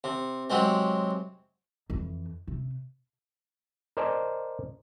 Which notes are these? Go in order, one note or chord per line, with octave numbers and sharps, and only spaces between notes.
C3
C3 F#3 G#3 C4
F2 E3
C3
A#4 C5 D5 D#5 G#5 A5